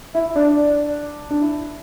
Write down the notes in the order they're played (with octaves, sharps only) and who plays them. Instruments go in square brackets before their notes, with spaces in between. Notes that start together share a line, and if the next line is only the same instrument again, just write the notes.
[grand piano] E4 [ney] E5
[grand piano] D4 [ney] D5
[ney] D5
[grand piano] D4
E4